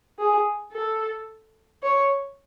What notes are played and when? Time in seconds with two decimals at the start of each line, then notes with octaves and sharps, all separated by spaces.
0.19 G#4
0.73 A4
1.83 C#5